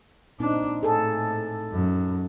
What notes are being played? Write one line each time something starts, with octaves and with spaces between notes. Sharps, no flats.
A#2 C4 D4 D#4
A2 G#4 A4
F#2